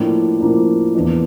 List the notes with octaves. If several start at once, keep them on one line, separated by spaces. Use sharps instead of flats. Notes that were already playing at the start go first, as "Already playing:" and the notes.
Already playing: A2 F3 A#3 D4
A2 F3 A#3 D4
E2 E3 A#3 D4